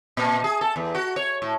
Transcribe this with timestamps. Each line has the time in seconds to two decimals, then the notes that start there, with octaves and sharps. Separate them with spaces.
0.17 A#2
0.44 G#4
0.61 A4
0.76 E2
0.95 F#4
1.16 C#5
1.42 A2